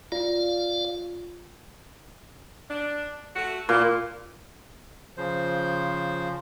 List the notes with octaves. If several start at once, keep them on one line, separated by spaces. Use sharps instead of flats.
F4 D5 F5
D4
A3 F#4
A#2 E4 F4
C#3 F3 C5